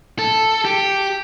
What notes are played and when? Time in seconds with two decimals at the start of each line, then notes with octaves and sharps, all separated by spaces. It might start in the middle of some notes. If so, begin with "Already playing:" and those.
0.19 A4
0.65 G4